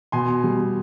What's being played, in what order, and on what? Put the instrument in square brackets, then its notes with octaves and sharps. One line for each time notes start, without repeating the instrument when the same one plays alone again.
[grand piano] B2 G#5 C6
G3